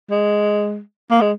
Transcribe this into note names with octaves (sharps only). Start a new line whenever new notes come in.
G#3
A#3
G#3